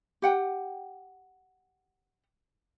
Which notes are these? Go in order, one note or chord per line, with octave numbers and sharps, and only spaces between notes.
G4 F#5 G5